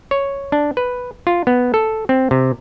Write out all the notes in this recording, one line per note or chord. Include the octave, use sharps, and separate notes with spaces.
C#5
D4
B4
F4
B3
A4
C4
C3